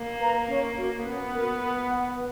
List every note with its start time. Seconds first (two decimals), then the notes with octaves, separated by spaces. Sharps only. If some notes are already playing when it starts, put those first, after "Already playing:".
Already playing: A#3
0.21 B4 F5 A#5
0.48 C#4
0.76 F#4 A#4
1.04 B3 C#4
1.32 F#4 A#4
1.60 B4
1.89 F#5 B5
2.16 B4